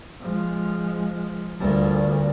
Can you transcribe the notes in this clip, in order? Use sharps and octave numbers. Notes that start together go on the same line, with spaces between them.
F3 G#3
D2 G2 A#2 D3